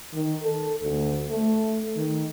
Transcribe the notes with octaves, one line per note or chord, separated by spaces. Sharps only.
D#3
A4
D2
A3
D#3